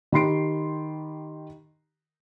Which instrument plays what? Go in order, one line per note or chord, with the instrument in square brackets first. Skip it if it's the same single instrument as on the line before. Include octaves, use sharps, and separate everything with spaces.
[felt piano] D#3 G4 B5 C6 C7 D7